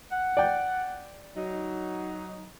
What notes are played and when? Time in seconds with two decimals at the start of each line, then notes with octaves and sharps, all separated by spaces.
0.11 F#5
0.37 D5 G5
1.36 F#3 D#4